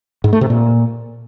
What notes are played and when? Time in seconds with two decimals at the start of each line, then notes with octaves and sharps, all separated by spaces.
0.24 G#2
0.33 A3
0.41 C3
0.50 A#2